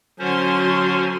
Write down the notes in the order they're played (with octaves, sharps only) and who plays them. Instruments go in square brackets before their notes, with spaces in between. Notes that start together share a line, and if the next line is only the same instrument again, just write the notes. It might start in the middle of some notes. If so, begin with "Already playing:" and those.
[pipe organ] D3 C#4 C5 [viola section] F#3 C6 [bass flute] F#4